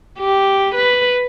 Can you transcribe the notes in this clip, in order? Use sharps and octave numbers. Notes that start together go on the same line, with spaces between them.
G4
B4